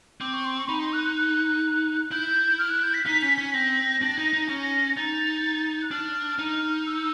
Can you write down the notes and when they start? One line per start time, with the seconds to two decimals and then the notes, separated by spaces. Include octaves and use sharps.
0.21 C4 D6
0.33 C#6
0.45 C6
0.57 C#6
0.68 D#4 B5
0.81 C6
0.93 F#6
1.04 F#6
1.16 F#6
2.11 E4 G6
2.58 F6
2.71 F#6
2.83 G6
2.94 B6
3.06 D#4 B6
3.22 C#4 B6
3.37 C#4 B6
3.54 C4 A#6
4.02 D4
4.17 D#4
4.33 D#4
4.49 C#4 A#6
4.96 D#4 A6
5.82 F#6
5.91 D4 F6
6.39 D#4
6.86 E6